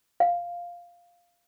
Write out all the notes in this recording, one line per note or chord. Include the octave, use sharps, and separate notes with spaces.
F5